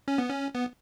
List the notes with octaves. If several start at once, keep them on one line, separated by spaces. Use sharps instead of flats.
C#4
B3
C#4
B3